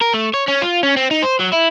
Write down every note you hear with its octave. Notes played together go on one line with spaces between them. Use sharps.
A#4
A3
C#5
C#4
F4
C#4
C4
D#4
C5
F#3
E4